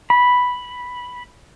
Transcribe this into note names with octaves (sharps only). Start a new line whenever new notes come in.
B5